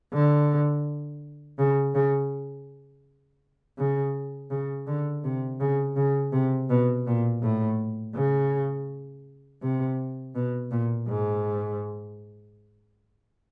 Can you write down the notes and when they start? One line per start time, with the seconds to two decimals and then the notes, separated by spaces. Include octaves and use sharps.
0.13 D3
1.58 C#3
1.94 C#3
3.78 C#3
4.50 C#3
4.87 D3
5.24 C3
5.60 C#3
5.96 C#3
6.32 C3
6.69 B2
7.07 A#2
7.42 A2
8.15 C#3
9.62 C3
10.35 B2
10.71 A#2
11.08 G#2